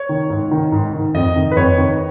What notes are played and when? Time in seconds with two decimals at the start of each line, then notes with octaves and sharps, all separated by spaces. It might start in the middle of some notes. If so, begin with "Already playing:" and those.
Already playing: C#5
0.09 D#3
0.30 G#2
0.51 D#3
0.72 G#2
0.93 D#3
1.14 F2 D#5
1.36 D#3
1.51 B4
1.56 F2 C#5
1.78 D#3